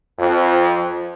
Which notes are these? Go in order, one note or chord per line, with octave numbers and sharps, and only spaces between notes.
F2